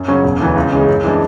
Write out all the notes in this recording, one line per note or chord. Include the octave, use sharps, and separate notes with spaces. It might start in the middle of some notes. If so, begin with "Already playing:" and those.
Already playing: F#2
C#3 F#3 C#4
E1
D2 C#3 E3
C#2
C#3 E3 G#3
F#2
E3 G#3 D4